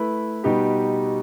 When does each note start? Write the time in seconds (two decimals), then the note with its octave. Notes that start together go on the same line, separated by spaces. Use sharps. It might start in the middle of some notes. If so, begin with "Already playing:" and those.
Already playing: A3 E4 B4
0.43 B2 G3 D#4 G4 B4